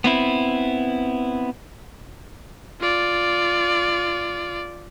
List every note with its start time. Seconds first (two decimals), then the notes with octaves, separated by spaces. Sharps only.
0.04 B3 C4 E4
2.81 F4 D5